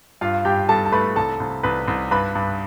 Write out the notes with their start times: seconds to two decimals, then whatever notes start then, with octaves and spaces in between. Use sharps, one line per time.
0.21 G2 F4 F5
0.45 G2 G4 G5
0.69 G2 A4 A5
0.86 A5
0.92 A3 B4 B5
1.16 C2 A4 A5
1.40 C2
1.63 C2 B4 B5
1.88 C2
2.11 G2 B4 B5
2.35 G2